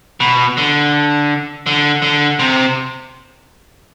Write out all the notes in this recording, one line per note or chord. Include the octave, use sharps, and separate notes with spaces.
B2
D3
D3
D3
C3